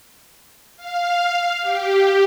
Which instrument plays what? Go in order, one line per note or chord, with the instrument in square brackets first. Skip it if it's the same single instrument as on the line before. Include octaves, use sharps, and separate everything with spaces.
[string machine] F5
G4